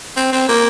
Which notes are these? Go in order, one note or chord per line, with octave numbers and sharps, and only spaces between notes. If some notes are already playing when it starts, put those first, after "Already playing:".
C4
C4
A#3